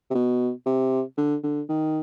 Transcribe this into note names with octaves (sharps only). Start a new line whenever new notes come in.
C3
B2
C3
D3
D3
D#3